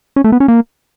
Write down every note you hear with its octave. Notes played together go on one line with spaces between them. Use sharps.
C#4
A3
B3
C#4
A#3